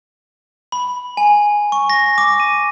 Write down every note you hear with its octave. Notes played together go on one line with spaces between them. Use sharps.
B5
G#5
C#6
A#6
D6
D#7